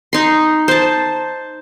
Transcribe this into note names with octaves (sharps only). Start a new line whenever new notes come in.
D#4 C6
C5 A5